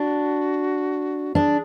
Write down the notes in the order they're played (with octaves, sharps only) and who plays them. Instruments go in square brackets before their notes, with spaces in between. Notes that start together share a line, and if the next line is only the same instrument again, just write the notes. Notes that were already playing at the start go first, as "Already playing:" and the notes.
Already playing: [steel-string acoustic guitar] D4 [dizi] F#4
[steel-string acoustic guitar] D4 [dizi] G#4